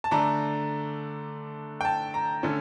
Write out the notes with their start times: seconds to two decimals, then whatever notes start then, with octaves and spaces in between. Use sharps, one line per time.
0.04 A5
0.11 D3 A3 D4 A#5
1.81 G5
1.85 A5
2.14 A#5
2.43 D3 A3 C#4